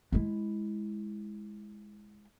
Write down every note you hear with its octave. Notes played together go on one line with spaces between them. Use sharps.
G#3 E4